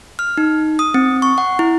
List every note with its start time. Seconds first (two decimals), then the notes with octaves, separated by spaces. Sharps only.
0.19 F6
0.38 D#4
0.79 D#6
0.94 C4
1.22 C#6
1.38 F#5
1.59 E4